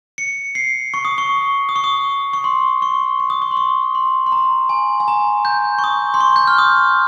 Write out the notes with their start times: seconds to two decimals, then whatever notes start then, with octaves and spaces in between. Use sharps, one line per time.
0.18 C#7
0.55 C7
0.94 C#6
1.05 D#6
1.18 C#6
1.69 D#6
1.76 C#6
1.84 D#6
2.33 C#6
2.44 C6
2.82 C#6
3.20 C#6
3.30 D#6
3.42 C#6
3.51 C6
3.57 C#6
3.95 C6
4.26 C6
4.32 A#5
4.69 G#5
5.00 G#5
5.08 A#5
5.45 G6
5.78 C#6
5.84 D#6
6.14 C6
6.20 C#6
6.36 G6
6.47 F6
6.58 D#6